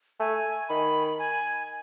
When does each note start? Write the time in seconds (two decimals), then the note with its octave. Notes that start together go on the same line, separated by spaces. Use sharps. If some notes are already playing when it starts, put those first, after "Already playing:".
0.20 A3 G#5
0.69 D#3 B5
1.19 G#5